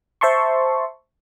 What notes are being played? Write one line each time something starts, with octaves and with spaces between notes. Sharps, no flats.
C5 E5 A5 C6 C#6